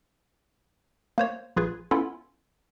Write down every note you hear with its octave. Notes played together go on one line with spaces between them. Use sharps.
A#3 C5 C#5
A#1 F4 G#4 B4 G#6
B3 C#4 E4 F4 A4